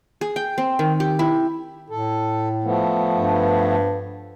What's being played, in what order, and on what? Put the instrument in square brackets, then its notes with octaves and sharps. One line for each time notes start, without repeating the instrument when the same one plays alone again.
[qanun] G#4
G5
C4
D#3
G4
E4
[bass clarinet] A2 [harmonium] A4
[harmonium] F3 A3 B3
[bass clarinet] G2